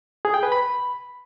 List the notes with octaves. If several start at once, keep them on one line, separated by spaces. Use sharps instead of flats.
G#4
G5
B4
B5